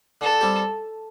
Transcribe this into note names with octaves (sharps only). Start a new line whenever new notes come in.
D3 A4
G3 C4 G4